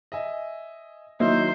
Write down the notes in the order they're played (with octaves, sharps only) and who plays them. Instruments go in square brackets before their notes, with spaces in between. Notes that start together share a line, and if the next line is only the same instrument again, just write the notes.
[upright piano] D#5 E5 G#5
[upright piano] D#3 F#3 E4 [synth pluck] A#3 [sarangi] C5 [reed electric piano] D#5 E5